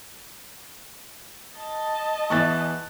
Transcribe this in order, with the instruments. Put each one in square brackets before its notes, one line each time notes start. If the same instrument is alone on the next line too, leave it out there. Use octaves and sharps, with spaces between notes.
[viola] D#5 A5
[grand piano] E2 E3 E5 [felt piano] C#6 F#6 A6